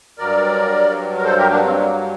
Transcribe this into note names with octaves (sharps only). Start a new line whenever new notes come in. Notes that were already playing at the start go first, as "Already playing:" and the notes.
G2 F#3 A#4 D5
A#4
A4 C5
G4 A#4
A#3 D4
C4
A#3